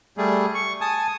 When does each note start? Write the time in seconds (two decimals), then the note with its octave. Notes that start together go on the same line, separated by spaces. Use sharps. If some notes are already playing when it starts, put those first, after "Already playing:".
0.17 G3 A3 G#4
0.55 C#6
0.81 G#5 A5 D#6